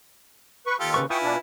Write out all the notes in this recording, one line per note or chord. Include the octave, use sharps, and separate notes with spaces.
B4 C#6
D#2 F4 G4 A4
C#3 B4 C#6
E4 F4 B4 G5 G#5 C#6 D#6
B2 D4